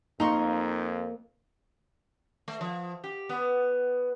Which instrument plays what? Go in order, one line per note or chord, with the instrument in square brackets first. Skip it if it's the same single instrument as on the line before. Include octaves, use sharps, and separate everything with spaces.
[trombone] F2 [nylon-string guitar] A#3 [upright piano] D#4 [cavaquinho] A#5 C6 C#6
[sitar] A3
F3
G4
B3